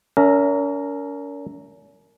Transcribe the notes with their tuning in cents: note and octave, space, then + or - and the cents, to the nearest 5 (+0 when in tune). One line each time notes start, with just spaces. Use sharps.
C#4 +40 A#4 -10 E5 +0